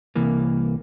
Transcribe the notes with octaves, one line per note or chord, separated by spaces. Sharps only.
C2 E3 A#3